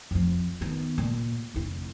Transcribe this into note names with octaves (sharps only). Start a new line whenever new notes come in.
F2 F3
D#3 B3
A#2
F1 E4